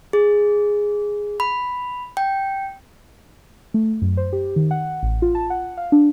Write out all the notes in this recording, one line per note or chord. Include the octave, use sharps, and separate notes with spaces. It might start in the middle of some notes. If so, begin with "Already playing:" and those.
G#4
B5
G5
A3
F#2
C5
G4
D#3
F#5
A1
F4
A5
F#5
F5
D4